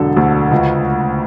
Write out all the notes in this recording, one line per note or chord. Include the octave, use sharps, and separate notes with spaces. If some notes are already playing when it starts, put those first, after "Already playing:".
Already playing: E1 D3 F#3 A4
D2
C#2